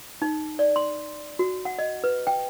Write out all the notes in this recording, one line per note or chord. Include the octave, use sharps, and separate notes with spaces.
D#4
D5
C6
F#4
F#5
D#5
B4
G5